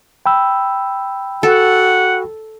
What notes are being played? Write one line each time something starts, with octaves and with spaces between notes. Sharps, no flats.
G5 B5 E6
F#4 A4 F#5